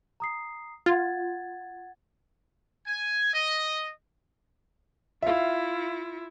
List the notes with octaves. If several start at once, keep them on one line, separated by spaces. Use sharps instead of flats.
A#5 D#6 C7
F4 F#5 G#6 A6
G#5
D#5
E4 F4 E5 F5